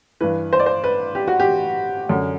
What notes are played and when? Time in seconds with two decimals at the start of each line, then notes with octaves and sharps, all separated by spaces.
0.21 G2 E3 B4
0.53 C5
0.60 D5
0.66 C5
0.84 B4
1.15 G4
1.28 F#4
1.40 G4
2.09 F#2 D3